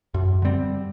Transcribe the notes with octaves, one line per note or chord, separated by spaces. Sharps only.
F#2
D3 G3 C4